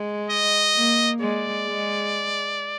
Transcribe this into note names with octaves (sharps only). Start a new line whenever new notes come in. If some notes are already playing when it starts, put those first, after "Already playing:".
Already playing: G#3
D#5
A#3
G#3 D5
G#3